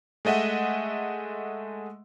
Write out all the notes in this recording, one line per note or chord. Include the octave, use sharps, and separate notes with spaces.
G#3 A3 D#5 E5 F#5